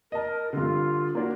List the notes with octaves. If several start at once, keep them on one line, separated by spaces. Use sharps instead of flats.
A#4 D#5 A5
G2 D3 F4
A#3 D4 F#4